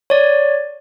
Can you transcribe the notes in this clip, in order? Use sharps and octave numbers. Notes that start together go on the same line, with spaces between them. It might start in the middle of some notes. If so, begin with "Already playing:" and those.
C#5 D5